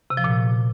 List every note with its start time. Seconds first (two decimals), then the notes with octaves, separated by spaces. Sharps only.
0.10 C3
0.17 F3
0.24 A#2